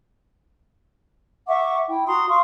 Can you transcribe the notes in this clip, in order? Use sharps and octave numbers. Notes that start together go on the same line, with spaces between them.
E5 F#5 C#6 D6
E4 G5
F#4 A#5 C6 D#6
F5 C6 C#6 D#6